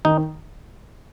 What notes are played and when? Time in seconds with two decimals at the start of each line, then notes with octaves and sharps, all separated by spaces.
0.05 D#3 D#4